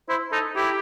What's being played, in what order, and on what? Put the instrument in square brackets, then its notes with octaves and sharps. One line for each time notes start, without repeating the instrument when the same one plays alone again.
[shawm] E4 [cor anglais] C5
[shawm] D#4 [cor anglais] A4
[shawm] E4 [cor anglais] G4